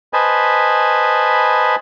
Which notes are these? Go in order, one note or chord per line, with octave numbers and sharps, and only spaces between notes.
B4 C5 D#5 G#5 A5 B5